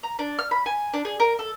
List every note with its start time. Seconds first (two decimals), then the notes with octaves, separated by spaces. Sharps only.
0.03 A#5
0.19 D4
0.39 F6
0.51 B5
0.66 G#5
0.94 D4
1.05 G#4
1.20 A#4
1.39 A4